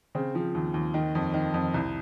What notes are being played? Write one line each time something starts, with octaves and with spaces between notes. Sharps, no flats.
C#3 C4
F3
D#2
D#2
D#3
F2
D#3
F2
C2